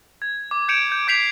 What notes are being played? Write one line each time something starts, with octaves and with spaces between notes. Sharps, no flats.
G#6
D6
G6 G#6 C#7 D7 E7 F7
G6
D6 G6 B6 C7 F7